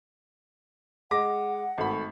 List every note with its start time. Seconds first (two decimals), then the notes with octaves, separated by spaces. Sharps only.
1.11 G#3 F#5 D6 A#6
1.78 G#1 A3 B5